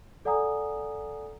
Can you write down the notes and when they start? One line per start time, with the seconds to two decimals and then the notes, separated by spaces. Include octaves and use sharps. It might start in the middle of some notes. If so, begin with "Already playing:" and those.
0.25 A4 D5 F#5 G#5 A#5 D#6